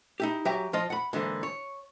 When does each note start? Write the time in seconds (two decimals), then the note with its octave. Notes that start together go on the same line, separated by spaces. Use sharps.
0.20 D#4 E4 G4
0.45 F#3 G4 E5 G5 G#5 A#5
0.73 F3 F4 D#5
0.90 F#5 B5
1.13 G#2 D3 E3 A#3
1.43 C#5